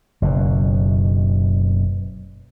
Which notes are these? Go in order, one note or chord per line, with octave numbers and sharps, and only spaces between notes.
F#1 B2